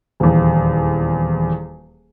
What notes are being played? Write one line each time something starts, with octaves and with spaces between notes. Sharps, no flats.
D#1 E2